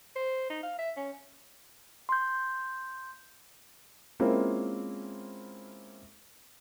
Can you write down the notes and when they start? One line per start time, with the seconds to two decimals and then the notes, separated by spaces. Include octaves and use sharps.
0.16 C5
0.50 D#4
0.63 F5
0.79 E5
0.97 C#4
2.09 C6 G6
4.20 G#3 A#3 C4 C#4 E4 F4